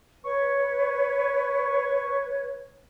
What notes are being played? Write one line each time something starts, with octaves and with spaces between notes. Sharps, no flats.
B4 C#5 C#6